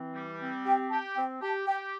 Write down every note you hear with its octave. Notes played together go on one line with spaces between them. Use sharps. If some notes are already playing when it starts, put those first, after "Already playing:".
Already playing: E3 C4
G3
C4
G4 G5
G4 A5
C4 G5
G4 A5
G4 G5